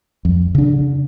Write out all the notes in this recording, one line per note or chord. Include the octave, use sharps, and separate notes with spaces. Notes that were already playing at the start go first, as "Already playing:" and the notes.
F2
C#3 D4